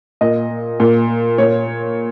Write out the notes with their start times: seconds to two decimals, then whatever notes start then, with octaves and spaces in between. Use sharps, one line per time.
0.21 A#2 D#5
0.80 A#2
1.38 A#2 C#5